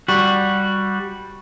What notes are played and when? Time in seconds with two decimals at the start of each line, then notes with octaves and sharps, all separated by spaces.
0.08 G3 F#4